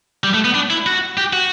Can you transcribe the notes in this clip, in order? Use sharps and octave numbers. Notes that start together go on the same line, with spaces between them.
G3
A3
B3
D4
E4
F#4
G4
F#4